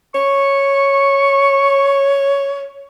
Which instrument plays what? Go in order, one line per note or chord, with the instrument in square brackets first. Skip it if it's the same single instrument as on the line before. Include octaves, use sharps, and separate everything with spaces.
[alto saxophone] C#5 [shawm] C#6